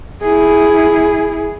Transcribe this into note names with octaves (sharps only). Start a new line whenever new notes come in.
E4 G#4